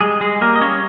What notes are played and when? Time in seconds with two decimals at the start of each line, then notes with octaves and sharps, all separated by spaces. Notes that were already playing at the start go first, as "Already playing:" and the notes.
0.01 G3 G#3 G#4
0.21 G#3 G#4
0.41 G3 A#3 A#4
0.56 D#5
0.61 C#4 C#5